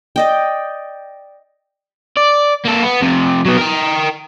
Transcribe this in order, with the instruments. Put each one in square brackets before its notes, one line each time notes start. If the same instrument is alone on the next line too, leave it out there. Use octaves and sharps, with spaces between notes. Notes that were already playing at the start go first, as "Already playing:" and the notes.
[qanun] D5 D#5 G5
[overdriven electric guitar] D5
A#3 A4
B3
F2 C3
F#3 B3
A#4 G5